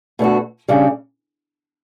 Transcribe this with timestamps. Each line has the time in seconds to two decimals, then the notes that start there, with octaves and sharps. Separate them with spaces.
0.19 B2 A3 D4 F#4
0.68 C#3 G3 D4